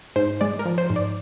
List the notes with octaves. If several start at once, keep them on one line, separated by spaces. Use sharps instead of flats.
G#2 C5
G#3 D5
A#4
F3
C5
G#2
D5